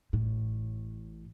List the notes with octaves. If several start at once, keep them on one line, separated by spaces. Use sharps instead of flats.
A1 A2